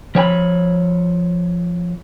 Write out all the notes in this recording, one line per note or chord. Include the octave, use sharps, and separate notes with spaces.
F3 C#5 G5 B5